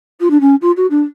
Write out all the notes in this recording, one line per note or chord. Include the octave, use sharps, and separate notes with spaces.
F4
D4
C#4
F4
F#4
D4